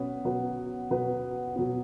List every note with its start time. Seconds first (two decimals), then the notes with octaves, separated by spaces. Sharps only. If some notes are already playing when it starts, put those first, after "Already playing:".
Already playing: B2 F#3 B3 C#4 B4 C#5
0.25 B2 F#3 B3 B4
0.90 B2 F#3 B3 B4
1.56 B2 F#3 B3